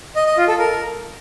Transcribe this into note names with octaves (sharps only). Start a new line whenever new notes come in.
D#5
D#5
F4
A4
A#4